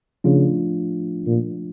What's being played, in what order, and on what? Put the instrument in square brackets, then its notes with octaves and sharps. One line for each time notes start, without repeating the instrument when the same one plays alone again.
[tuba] C#3 [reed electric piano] F3 A3 D4 F4
[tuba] A#2